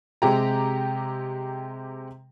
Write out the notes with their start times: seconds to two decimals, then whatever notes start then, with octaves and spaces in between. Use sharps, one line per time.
0.22 C3 G#3 G4 A#5